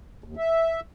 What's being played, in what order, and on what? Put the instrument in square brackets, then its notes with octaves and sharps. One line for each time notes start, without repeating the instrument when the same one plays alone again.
[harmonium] D#2
E5